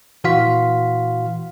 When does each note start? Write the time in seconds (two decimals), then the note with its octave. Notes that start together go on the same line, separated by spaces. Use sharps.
0.24 A#2 E3 F#4 F5 C6 B6